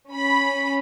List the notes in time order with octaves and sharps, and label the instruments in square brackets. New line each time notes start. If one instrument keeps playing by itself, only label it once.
[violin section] C#4 B5